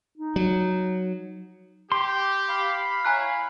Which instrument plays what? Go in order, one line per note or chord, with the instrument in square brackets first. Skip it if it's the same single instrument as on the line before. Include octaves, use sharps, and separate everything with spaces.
[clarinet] D#4
[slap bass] F#3
[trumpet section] G4 [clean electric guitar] C6
[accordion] F5 B5
[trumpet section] E4 C#5 [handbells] G#5 A#5 F#6